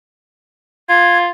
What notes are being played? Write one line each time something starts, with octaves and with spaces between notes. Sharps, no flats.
F4 G#6